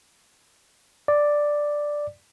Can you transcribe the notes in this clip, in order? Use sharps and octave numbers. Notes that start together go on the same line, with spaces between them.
D5